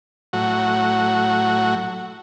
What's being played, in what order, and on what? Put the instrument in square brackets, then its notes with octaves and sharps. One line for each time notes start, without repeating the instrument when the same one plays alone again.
[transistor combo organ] A2 F#3 F#4